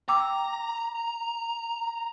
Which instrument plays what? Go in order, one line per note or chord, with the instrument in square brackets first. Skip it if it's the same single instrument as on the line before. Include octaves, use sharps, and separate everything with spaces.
[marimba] G5 D6 E6 [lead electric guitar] A#5